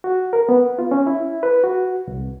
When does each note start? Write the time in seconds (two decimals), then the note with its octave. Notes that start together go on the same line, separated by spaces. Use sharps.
0.04 F#4
0.33 A#4
0.49 B3
0.79 F4
0.91 C#4
1.07 E4
1.43 B4
1.64 F#4
2.08 C2